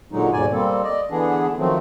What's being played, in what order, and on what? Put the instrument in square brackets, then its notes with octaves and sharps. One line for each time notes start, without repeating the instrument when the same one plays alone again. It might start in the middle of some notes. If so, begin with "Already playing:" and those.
[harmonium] A#2 D3 F#3 G#3 D#4
D#2 G#2 B2 D5 G#5
G3 A#3 C4 A4
D5 D#5
D3 E3 B3 D4 G#4
D#3 F3 F#3 A3 C4